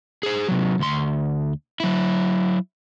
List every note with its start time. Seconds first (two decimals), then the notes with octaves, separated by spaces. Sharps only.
0.23 G#4 C5
0.48 C3 F#3
0.79 D2 C6
1.80 F#3 E4